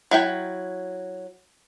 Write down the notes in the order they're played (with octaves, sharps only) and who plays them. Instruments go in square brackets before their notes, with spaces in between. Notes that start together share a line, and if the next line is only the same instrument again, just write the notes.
[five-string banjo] F#3 E4 G5